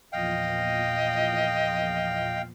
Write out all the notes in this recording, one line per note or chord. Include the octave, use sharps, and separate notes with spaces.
E2 A#2 F3 D#5 F5 G5